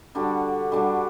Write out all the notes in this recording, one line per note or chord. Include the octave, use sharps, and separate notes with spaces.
D3 G3 D4 F#4
D3 G3 D4 F#4